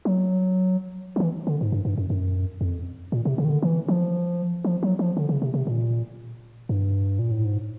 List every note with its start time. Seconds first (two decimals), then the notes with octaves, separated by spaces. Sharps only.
0.05 F#3
1.16 F3
1.20 E3
1.47 D3
1.61 G#2
1.72 G2
1.85 G2
1.98 F#2
2.10 F#2
2.61 F2
3.12 A#2
3.25 C3
3.38 C#3
3.45 D#3
3.50 D3
3.62 E3
3.88 F3
4.65 F3
4.83 F#3
4.99 F3
5.17 D3
5.29 C#3
5.42 C3
5.54 C3
5.67 A#2
6.69 G2
7.19 A#2
7.31 A2
7.44 G#2